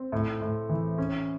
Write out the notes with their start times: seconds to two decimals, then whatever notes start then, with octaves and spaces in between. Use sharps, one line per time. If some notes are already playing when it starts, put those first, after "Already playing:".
Already playing: C4
0.12 A2
0.41 A2
0.69 E3
0.98 C#4